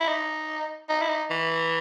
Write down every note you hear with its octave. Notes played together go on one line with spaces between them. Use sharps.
E4
D#4
D#4
E4
D#4
E3